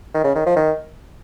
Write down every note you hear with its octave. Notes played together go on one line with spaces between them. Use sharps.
D#3
C#3
D#3
F3
D#3